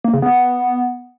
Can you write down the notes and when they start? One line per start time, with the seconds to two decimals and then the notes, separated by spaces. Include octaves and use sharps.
0.04 A#3
0.13 C#3
0.22 B3